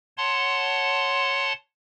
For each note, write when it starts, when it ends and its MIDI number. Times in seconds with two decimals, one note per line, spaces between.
0.17 1.53 73
0.17 1.53 78
0.17 1.53 81
0.17 1.53 84